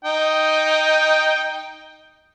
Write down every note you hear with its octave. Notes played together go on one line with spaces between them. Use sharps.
D#4 G5